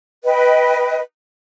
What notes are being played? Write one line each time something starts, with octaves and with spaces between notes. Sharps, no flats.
B4 D#5 G5